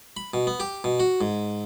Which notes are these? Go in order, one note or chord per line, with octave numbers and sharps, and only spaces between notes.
B5
B2
B3
G4
B2
F#4
G#2